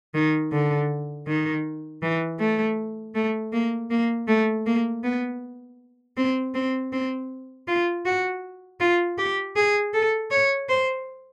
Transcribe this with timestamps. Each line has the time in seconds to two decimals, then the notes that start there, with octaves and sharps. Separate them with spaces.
0.14 D#3
0.52 D3
1.27 D#3
2.02 E3
2.39 A3
3.15 A3
3.53 A#3
3.90 A#3
4.28 A3
4.66 A#3
5.04 B3
6.17 C4
6.54 C4
6.92 C4
7.68 F4
8.06 F#4
8.80 F4
9.18 G4
9.56 G#4
9.94 A4
10.31 C#5
10.69 C5